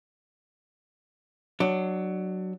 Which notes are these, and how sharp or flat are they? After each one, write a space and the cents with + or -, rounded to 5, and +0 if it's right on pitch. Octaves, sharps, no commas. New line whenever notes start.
F#3 +10 D4 +30